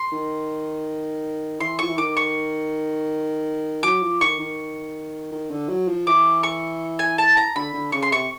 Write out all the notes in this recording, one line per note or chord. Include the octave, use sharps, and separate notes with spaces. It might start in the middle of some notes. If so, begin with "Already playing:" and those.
Already playing: C6
D#3
E3 C6
F3 C#6
E3
D#3 D6
C#6
F#3 D6
F3
D#3 C#6
D#3
D#3
D3
F#3
F3
E3 D6
C#6
G#5
A5
A#5
D3 B5
D3
C#3 C#6
C6
C3 C#6